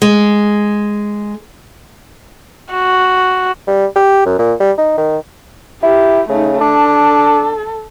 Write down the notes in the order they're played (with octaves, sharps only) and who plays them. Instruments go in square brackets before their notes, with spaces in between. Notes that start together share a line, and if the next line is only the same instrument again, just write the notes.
[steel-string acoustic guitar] G#3
[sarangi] F#4
[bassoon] G3
G4
F#2
A#2
G3
D#4
D#3
[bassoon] E4 [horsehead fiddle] G4
[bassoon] C#3 [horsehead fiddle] A3 D#4
[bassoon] D4 [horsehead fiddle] A4